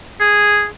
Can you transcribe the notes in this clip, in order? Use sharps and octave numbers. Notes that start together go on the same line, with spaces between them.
G#4